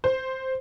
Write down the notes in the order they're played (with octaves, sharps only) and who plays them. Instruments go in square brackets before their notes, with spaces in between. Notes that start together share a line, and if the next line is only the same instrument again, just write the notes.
[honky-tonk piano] C5